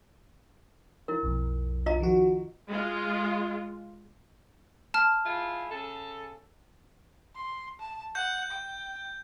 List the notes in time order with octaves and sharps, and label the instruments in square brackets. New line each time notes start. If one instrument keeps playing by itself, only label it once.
[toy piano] E4 A#4
[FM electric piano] B1 F2
[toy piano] F4 D#5 A#5
[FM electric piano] D#3 F3 F#4
[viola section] G#3 F4
[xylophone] A5 F6
[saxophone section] G#3 E4 F4
C#3 A4
[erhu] C6
A5
[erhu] F#5 [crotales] G6
[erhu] G5